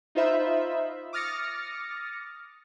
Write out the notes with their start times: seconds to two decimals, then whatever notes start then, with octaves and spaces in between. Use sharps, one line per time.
0.15 D#4 F4 C5 E5 B5
1.13 D6 D#6 F6 A6 A#6 C#7